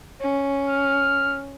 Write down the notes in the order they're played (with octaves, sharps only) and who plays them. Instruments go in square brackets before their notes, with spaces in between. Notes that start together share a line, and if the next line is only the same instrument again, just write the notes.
[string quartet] C#4
[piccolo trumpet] F6